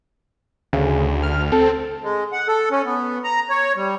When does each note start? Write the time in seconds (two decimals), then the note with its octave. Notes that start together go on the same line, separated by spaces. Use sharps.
0.73 D2 C#3
1.23 F6
1.52 C4 A4
2.03 G#3
2.33 F#5
2.48 A4
2.71 C#4
2.85 B3
3.24 A#5
3.50 C#5
3.76 G3